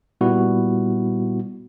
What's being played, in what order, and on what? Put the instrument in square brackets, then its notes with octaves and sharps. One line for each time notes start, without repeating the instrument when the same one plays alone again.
[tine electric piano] A#2 G3 B3 E4 F#4